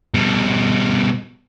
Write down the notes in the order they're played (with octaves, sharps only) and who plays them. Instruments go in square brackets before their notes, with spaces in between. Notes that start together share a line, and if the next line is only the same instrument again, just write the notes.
[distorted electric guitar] B2 G3